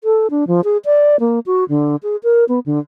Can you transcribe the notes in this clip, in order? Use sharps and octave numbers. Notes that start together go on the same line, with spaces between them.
A4
D4
F3
G#4
D5
A#3
F#4
D3
G#4
A#4
B3
D3